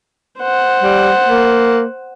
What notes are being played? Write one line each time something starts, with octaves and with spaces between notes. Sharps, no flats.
C5 F#5
G3
A#3